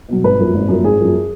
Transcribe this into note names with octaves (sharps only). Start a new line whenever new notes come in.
B2 F#3
G#1 B4
F#2 F3 A#3
G#1
F#2 F3 A#3
G#1 G#4
F#2 F3 A#3